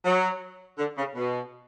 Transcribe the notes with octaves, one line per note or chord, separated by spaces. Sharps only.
F#3
D3
C#3
B2